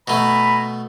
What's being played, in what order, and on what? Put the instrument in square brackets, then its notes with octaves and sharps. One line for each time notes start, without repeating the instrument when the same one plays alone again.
[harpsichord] B2 A3 [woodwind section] G#5 A#5 B5